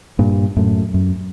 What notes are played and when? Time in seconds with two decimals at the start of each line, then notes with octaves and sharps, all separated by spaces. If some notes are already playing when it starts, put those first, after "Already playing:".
0.19 G2 A#2
0.57 F#2 A2
0.94 F#2